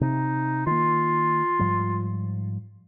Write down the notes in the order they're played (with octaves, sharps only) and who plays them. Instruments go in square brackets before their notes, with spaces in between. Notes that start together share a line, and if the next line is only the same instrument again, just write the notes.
[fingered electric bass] C3 [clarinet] D#4
[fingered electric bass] D#3 A#3 [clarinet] F4
[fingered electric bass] G#2 F3 G3